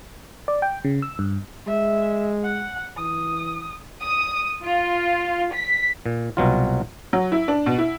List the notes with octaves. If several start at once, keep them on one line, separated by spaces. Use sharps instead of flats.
D5
G5
C#3
E6
G2
G#3 E5
F#5
E3 D#6
D#6
F4
B6
A#2
C2 B2 F#3 F4
F#3
E4
D4
B2
E4